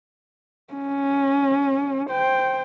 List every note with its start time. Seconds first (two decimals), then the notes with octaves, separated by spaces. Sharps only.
0.74 C#4
2.10 C5 G5